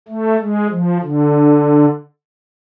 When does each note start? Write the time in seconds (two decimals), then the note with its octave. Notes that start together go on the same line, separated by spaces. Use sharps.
0.08 A3
0.39 G#3
0.70 F3
1.02 D3